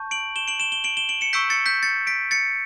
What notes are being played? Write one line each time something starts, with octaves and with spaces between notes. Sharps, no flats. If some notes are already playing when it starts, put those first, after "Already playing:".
Already playing: A5 C#6 G6
D7 F#7
E7 G7
D7 F#7
E7 G7
E7 G7
D7 F#7
E7 G7
D7 F#7
C#7 E7
C#6 E6 G6 B6 D7
A6 C#7
G6 B6
A6 C#7
B6 D7
A6 C#7